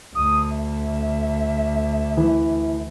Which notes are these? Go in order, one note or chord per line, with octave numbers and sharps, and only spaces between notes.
D2 D#6
E5
E3